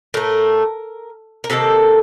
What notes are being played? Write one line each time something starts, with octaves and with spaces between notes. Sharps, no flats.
A2 A3 A#4
A#4
C3 D#3 A#3 A4